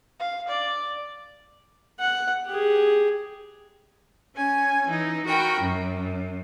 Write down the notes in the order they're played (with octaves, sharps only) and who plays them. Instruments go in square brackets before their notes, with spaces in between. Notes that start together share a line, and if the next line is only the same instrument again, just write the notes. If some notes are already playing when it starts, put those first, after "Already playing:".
[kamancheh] F5
D5
[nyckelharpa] F#5
G4 G#4
[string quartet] C#4 G#5
E3 D#4
F#4 A#4 G5 B5
F#2